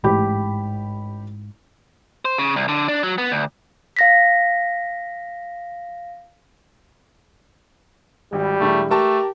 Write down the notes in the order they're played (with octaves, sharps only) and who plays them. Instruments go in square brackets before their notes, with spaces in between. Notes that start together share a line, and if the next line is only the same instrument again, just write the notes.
[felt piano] A1 G4 B5 [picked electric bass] G#2
[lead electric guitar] C5
C#3
C2
D3
D4
F#3
B3
D2
[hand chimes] F5 A#6 B6
[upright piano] G#1 [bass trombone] G3
[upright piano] E1 G#3 E4 [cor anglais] A3
[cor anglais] A3 [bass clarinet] G4 [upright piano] A#4 A5 A#5